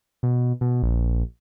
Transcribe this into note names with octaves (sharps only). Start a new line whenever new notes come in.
B2
B2
A#1